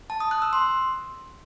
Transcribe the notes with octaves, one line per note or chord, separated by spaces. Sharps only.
A5
D#6
F#6
E6
C6